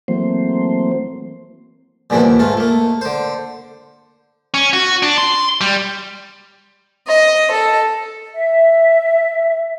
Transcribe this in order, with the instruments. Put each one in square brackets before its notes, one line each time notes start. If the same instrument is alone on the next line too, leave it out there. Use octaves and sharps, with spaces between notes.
[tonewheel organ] E3 F#3 A3 A#3 C4 C5
[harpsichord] G2 A#2 C#3 E3 F3 B3
D#2
G#2 A3 F4
A3 A#3
D3 C5
[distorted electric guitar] C#4
F#4
D4
C6
G3
[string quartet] D#5
A4
[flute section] E5